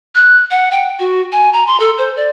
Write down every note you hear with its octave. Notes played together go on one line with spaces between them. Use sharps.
F#6
F#5
G5
F#4
G#5
A#5
C6
A4
C5
D5